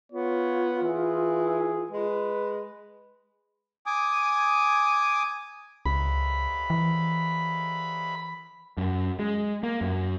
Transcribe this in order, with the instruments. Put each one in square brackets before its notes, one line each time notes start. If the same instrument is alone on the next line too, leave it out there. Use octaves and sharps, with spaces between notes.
[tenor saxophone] B3 [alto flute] F4 [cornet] C#5
[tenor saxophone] E3 [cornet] G#4
[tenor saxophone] G#3 [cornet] B4
[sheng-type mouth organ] G#5 D6 D#6
[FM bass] C#2 [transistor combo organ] B5
[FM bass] E3
[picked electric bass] F#2
G#3
A#3
F#2